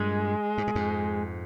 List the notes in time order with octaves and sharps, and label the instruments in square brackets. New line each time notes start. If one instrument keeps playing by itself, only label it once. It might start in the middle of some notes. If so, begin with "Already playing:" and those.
Already playing: [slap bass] G2 A#2 [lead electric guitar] G#3
[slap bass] G#2
A#2
F2 G#2